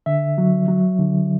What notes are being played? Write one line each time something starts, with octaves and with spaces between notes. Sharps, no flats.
D3 E5
F#3
F#3
D3